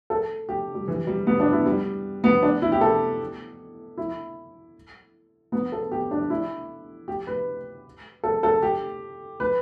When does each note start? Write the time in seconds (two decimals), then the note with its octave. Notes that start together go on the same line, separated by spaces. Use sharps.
0.10 A4
0.49 G4
0.75 G3
0.88 E3
1.07 G3
1.27 B3
1.40 D4
1.53 E4
1.66 G3
2.24 B3
2.43 D4
2.62 E4
2.72 G4
2.81 A4
3.97 E4
5.52 B3
5.72 A4
5.92 G4
6.11 D4
6.30 E4
7.08 G4
7.27 B4
8.24 A4
8.43 A4
8.62 G4
9.40 B4